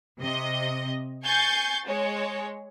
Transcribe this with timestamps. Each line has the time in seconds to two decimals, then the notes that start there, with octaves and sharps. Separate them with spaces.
0.20 C3 D#5
1.25 G#5 C#6 G6 A6 C7
1.86 G#3 C#5